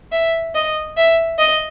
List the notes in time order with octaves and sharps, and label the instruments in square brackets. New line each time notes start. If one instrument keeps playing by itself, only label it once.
[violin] E5
D#5
E5
D#5